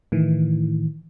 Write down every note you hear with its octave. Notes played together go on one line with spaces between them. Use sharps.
A2 D#3 E3